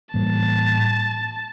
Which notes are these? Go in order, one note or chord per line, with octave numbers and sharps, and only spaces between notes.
A2 E3 G3 A#3 A5